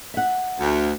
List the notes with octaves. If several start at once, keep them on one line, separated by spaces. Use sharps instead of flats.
E5 F#5
D2